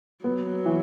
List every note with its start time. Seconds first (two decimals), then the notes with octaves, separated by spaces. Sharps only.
0.24 F#3 B3
0.65 E3